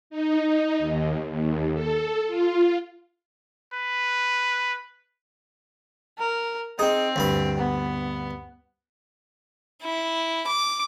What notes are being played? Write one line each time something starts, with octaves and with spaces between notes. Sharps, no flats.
D#4
D#2
D#2
A4
F4
B4
A#4
C4 D#4 G#4
D2 G2 B5
B3
E4
D6